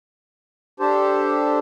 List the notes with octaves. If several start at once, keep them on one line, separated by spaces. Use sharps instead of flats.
D4 G4 A4 C5